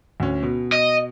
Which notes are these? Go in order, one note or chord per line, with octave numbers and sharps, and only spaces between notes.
D2 C#4
B2
D#5